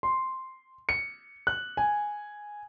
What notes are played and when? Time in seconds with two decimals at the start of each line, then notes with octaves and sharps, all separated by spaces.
0.03 C6
0.89 C#7
1.47 F#6
1.77 G#5